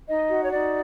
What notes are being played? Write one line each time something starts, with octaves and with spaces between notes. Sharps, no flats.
D#4 D#5
F#4
C#5
D#4 D5